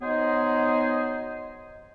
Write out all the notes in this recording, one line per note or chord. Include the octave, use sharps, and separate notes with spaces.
F#3 B3 D#4 G#4 C5 D#5